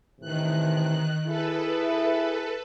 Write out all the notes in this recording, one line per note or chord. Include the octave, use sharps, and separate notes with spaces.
A2 C3 D#3 E3 F#6
E4 G#4 A4 B4